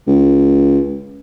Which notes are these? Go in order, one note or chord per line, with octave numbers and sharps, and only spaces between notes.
C#2